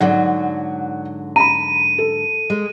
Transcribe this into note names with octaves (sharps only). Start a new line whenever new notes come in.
G#2 D3 F#3 D5 F#5
A#5 B5 D#7
A4
G#3